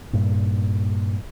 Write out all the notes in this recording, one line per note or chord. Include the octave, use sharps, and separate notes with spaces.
G2 A#2